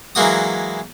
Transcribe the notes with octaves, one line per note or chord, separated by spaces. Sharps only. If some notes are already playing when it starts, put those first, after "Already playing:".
E3 F#3 G#3 A#3 F#4 D#6